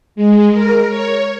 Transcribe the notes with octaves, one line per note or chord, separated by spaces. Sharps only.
G#3
A#4
C#5